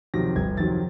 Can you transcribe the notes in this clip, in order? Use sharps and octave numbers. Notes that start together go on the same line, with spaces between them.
F2 C3 D#3 F#3 A#6
G1 G#6
F2 C3 D#3 F#3 A6